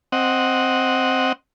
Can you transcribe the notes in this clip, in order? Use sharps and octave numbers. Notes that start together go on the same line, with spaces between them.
C4 D#5 F#5